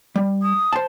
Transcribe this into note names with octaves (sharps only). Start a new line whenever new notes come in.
G3
D#6
C5 A5